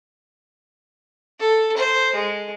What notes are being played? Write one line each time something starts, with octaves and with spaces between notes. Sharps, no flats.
A4
C5
G#3